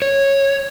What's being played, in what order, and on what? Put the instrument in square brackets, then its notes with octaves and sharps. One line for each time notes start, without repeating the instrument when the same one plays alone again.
[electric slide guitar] C#5